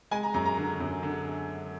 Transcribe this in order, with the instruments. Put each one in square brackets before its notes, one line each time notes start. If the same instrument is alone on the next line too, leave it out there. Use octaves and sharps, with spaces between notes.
[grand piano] G#3 G#5
A#5
F#2 A#5
A#5
D3
F#2
D3